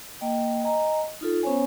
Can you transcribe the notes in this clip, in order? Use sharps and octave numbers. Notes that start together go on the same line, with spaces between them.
A#3 D#5 G5
D#5 G#5 A#5
D#4 F4 A4
B3 C#4 C5 C#5 G#5